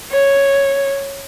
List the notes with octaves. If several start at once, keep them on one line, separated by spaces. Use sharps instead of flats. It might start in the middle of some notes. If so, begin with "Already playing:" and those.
C#5